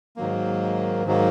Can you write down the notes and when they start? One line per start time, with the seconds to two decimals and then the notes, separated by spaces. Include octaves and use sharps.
0.17 G#2 D#3 F#3 A#3
1.06 G#2 D#3 F#3 A#3